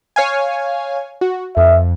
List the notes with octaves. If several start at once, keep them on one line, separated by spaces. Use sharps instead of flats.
C#5 F5 G#5
F#4
F2 E5